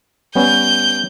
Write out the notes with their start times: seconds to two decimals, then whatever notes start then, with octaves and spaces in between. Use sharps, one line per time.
0.35 G3 B3 C#4 G6